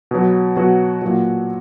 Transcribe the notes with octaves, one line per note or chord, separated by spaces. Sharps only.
B2 F#3
B2 F#3 F#4
A#2 F#3